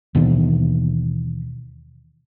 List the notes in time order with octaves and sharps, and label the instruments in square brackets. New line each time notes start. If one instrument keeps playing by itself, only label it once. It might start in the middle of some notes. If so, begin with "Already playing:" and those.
[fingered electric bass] D#2 B2 D#3 E3